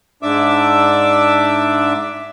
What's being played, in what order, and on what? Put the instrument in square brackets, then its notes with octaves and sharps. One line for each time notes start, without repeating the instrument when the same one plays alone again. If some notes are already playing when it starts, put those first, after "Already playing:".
[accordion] G#2 D4 E5 D6 E6